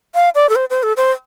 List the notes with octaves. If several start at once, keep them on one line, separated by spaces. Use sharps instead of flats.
F5
D5
A4
C5
C5
A4
C5